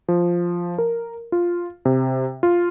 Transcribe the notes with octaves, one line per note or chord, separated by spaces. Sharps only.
F3
A#4
F4
C3
F4